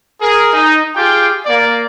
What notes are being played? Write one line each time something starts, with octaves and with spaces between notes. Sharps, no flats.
G#4 A#4
D#4
F4 G4 G#4 G5
A#3 D5